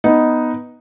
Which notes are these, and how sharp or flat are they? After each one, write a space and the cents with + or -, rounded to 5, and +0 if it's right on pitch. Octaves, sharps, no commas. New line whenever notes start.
B3 +0 D#4 +0